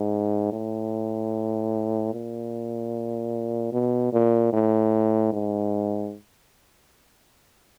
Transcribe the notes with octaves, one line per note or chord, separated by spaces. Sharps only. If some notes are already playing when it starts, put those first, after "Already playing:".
Already playing: G#2
A2
A#2
B2
A#2
A2
G#2